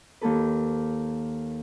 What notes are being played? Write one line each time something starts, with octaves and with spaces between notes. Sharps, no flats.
D#2 A#3 A4 B4